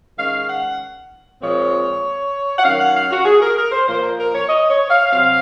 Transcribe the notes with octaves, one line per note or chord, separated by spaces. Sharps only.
D#3 G#3 C#4 F5
F#5
A#2 F3 G#3 C4 C#5
F#5
D#3 F#3 C#4 F5
F#5
F5
F#4
G#4
A#4
A#4
C5
A#2 F3 A#3 C5
A#4
A#4
C#5
D#5
C#5
F5
C3 F#3 C4 F5